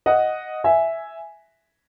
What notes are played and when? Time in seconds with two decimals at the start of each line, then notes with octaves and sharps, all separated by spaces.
0.06 D#5 F#5
0.64 E5 G#5